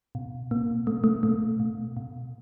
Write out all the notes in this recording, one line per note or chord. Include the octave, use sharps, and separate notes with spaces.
B2
B2 A#3
B2 A3
A3
B2 A3
B2
B2